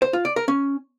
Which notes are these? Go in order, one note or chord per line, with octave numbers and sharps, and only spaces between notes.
C5
F4
D5
A#4
C#4